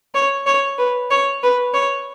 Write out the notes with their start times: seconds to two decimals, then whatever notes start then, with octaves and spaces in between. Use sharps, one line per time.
0.14 C#5
0.46 C#5
0.78 B4
1.10 C#5
1.43 B4
1.74 C#5